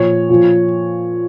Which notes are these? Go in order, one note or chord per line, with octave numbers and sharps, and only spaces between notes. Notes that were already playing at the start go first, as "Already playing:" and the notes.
Already playing: A#2 F3 C#5
A#2 F3